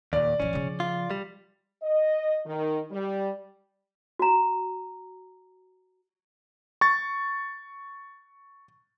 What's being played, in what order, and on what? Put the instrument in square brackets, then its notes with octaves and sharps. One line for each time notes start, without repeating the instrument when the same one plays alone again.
[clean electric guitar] D#2 A#2 [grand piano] D5
[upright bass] A#1 F3 [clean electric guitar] C#4
[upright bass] C#3 F3
[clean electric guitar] F4
G3
[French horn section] D#5
D#3
G3
[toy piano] F#4 A#5
[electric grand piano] C#6 A6